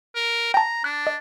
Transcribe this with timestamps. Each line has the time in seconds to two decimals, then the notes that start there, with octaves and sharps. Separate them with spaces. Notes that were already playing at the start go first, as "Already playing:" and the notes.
0.15 A#4
0.54 G5 A5 A#5
0.84 D4 F#6
1.07 D#5